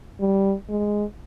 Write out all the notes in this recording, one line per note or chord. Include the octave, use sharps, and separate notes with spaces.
G3
G#3